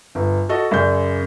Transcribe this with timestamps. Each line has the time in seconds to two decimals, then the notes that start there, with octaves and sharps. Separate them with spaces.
0.15 G1
0.49 F#4 A4 D#5
0.71 F#2 C#3 D5 G6